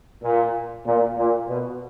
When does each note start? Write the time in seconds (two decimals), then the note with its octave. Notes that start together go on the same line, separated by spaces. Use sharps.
0.23 A#2
0.85 A#2
1.17 A#2
1.48 B2